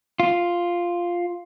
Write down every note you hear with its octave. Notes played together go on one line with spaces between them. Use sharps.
F4